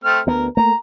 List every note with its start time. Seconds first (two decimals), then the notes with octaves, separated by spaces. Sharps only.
0.04 A3 C4 F6
0.27 D2 B3 A#4
0.57 A3 A#3 A#5